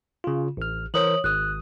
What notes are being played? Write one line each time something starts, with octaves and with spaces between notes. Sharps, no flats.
C#3 F4
A1 F6
E3 A#4 C5 C#5 D#6 F#7
G#1 D#6 F#6